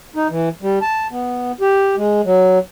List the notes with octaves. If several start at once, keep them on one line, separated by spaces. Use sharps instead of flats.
D#4
E3
G3
A5
B3
G4
G#3
F#3